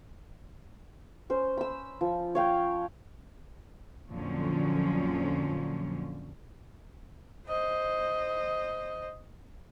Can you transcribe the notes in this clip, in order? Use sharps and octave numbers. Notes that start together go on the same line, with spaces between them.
C#4 C5
B5 E6
F3
C#5 F5 G5
F2 A#2 D3 F3 F#3 C#4
C5 D#5